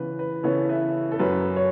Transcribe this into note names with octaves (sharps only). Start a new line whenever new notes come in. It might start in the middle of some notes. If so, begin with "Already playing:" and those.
Already playing: C#3 E3 B3 B4
B4
C#3 E3 B3 A4 C#5
B4 E5
A4
F#2 F#3 C#4 B4
C#5